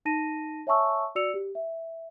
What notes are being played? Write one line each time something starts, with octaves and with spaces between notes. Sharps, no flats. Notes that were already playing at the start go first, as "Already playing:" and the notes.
D#4 A5 A#6 D#7
C#5 E5 G#5 A5 C#6 E6
F#4 D5 E6 C#7 F7
G4
E5